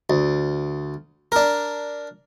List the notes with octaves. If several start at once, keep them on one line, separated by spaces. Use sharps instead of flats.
D2
D4 A#4